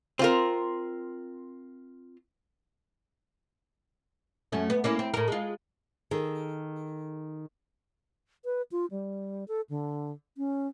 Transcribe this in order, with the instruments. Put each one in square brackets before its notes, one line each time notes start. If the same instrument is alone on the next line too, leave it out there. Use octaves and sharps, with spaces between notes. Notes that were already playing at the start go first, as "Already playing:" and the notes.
[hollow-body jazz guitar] C4 F4 A#4
[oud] F#2 A3 C#4
B3
A#3 C#4 E4
C4
A2 A#4
G#3 F4
[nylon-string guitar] D#3 G#4 A4
[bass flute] B4
F4
G3
A4
D3
C#4